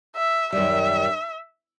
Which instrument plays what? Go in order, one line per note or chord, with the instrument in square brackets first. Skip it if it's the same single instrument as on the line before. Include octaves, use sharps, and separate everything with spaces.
[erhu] E5
[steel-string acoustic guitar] F#2 D#3 G3 [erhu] E5